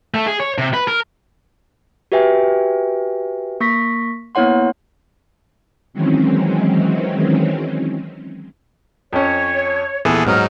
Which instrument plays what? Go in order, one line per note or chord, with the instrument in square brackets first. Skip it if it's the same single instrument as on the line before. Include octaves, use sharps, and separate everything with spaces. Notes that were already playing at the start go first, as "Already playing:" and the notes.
[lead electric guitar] A3
G#4
C#5
C3
B4
A#4
[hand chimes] F#4 G4 B4 E5 G5 G#5
A#3 C#6 A#6 B6
A#3 B3 E4 C#5 F#5 C6
[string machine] D#3 E3 F#3 G#3 C4 C#4
[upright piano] F2 C#4 [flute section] C#5
[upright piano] D#1 B3 [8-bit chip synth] E3 G#4 A4
[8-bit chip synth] G#2 F#3 D#4 [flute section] F6